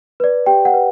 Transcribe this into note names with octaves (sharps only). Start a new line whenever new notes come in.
B4 D5
G4 G5
F#5
B4